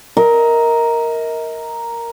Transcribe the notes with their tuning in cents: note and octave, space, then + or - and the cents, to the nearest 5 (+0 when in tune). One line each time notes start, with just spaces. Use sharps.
A#4 +0 D#5 +40